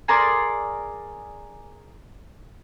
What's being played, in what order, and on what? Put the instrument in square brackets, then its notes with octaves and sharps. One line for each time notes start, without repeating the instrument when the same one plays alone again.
[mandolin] G#4 A#4 D5 C6